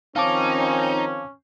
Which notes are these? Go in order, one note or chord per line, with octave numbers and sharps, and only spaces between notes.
D#3 F3 C4 C#4 D#4 F5 A5 D6